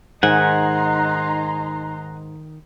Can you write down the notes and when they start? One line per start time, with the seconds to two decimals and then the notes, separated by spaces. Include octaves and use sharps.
0.23 G#2 D#3 D#4 F#5 G#5 A#5 C6